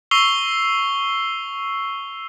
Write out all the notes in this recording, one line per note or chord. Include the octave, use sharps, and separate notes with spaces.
C#6 E6 C7 F7 G7